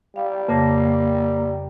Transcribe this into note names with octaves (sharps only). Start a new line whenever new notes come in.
G3 F5
F2 C#3 A#3 A5